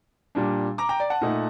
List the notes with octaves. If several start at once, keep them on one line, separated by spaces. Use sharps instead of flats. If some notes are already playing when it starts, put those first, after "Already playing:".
A#2 G3 D4
A#5 D6
G5 A#5
D5
F#5 A5
A#2 A3 D#4